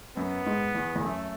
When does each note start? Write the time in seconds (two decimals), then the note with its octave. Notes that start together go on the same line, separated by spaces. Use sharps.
0.16 F#2 B3
0.46 G#2
0.75 E2
0.95 E2
1.04 F#2 A3